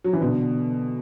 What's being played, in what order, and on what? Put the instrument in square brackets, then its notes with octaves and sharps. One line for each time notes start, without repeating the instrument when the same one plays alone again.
[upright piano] F#3
E3
B2 D3